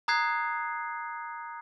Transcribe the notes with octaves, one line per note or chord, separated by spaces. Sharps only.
A#5 D#6 F#6 G#6 C7